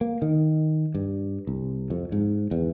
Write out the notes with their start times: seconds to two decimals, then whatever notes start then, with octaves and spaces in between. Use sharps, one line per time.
0.01 A#3
0.22 D#3
0.95 G2
1.47 C2
1.90 F2
2.12 G#2
2.51 E2